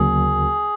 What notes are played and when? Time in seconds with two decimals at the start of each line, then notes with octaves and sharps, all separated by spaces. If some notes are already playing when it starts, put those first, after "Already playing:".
Already playing: D2 C#3 F#3 A#3 G#4